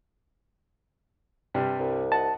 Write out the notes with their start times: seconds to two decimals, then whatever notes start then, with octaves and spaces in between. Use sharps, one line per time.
1.54 G2 C3 G3
1.79 C2
2.12 D#5 F#5 A5